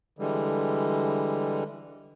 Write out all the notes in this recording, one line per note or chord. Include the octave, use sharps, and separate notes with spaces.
D3 E3 G3 G#3